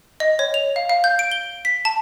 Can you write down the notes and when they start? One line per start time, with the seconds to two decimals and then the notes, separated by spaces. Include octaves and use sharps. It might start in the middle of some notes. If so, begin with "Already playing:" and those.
0.20 D#5
0.39 C#5
0.54 F7
0.76 F5
0.89 F5
1.04 G6
1.19 D7
1.31 G7
1.65 B6
1.85 A5